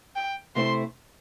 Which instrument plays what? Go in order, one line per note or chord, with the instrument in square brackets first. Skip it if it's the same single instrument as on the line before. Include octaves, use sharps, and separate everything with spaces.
[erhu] G5
[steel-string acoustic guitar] C3 A3 E4 C5 [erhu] C6